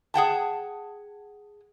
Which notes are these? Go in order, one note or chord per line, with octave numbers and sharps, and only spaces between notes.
G#4 F#5 G5 A5